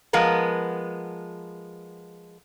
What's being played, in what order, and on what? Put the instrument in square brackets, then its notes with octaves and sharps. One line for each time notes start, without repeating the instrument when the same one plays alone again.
[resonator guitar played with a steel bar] F3 G#3 B3 A#4